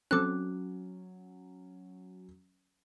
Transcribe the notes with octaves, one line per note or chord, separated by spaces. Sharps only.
F#3 C4 C#4 A4 D6 F#6